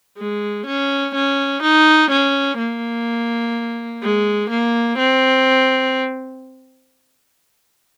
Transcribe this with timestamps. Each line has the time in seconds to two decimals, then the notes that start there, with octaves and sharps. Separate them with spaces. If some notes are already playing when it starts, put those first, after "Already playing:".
0.18 G#3
0.66 C#4
1.15 C#4
1.62 D#4
2.11 C#4
2.58 A#3
4.02 G#3
4.50 A#3
4.98 C4